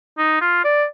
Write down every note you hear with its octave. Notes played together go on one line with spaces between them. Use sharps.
D#4
F4
D5